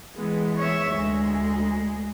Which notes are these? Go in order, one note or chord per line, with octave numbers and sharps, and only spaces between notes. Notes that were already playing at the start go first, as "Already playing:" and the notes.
E3 G#3 B3
C#5 E5
D2 G#3